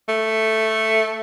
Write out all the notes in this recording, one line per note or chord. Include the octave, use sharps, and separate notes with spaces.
A3